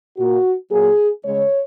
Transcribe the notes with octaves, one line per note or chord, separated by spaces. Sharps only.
A#2 A#3 F#4
A#2 F#3 A#3 G#4
C#3 G#3 C#5